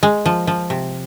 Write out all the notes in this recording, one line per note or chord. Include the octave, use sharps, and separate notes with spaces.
G#3
F3
F3
C3